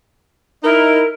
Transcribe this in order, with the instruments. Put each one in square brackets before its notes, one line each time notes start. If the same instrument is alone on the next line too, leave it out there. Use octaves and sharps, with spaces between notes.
[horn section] D#4 E4 [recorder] A#4